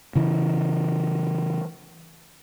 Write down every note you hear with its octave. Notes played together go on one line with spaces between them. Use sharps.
C#3 E3